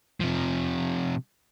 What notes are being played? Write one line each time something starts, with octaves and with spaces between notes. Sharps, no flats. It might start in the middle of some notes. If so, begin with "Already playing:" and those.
C3 F3